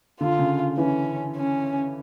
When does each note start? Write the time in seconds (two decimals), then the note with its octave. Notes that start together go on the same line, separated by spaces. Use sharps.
0.21 D3 F4
0.39 C#3
0.78 E3 C#4
1.36 C#4